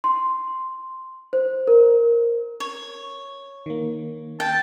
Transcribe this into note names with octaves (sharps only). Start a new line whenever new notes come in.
C6
C5
A#4
C#5
D#3 A#3
G5 A5